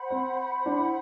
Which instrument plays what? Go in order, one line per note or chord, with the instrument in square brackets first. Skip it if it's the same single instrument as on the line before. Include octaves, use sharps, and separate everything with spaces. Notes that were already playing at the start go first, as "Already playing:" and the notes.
Already playing: [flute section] C5 F#5 B5
[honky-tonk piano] C4
D4
E4